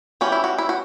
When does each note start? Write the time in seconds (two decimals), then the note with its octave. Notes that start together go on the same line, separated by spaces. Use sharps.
0.21 E3 G3 C#4 F#4
0.32 E4
0.44 F#4
0.58 E4
0.69 F#4